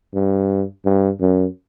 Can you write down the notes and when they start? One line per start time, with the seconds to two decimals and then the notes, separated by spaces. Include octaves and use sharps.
0.15 G2
0.85 G2
1.21 F#2